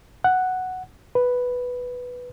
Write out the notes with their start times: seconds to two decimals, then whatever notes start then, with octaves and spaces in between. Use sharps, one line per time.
0.24 F#5
1.15 B4